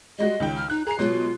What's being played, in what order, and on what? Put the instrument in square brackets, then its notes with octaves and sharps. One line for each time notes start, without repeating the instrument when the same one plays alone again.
[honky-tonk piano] G3 G#3 F#4 [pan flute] D#5
[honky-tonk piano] C#2 D#3 G5
[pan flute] F6
[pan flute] D#4 [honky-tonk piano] F#6
[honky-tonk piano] G#4 C7 [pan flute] A#5
[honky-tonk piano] B2 F#3 G#3 [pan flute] F4